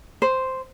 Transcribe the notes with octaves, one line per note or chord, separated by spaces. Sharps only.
C5